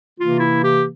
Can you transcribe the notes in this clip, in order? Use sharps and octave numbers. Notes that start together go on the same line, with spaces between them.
C3 E3 A#3 F4
E4
G4